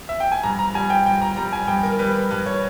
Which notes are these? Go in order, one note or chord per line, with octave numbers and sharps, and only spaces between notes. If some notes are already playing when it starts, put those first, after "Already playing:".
E5
G5
G#5
G2 A#5
A#5
G3 G#5
G5
G2 G5
A#5
G3 A#5
G#5
G2 G5
A#4
G3 B4
B4
G2 B4
C#5